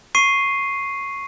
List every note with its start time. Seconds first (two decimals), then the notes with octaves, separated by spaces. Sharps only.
0.15 C#6 C7 D#7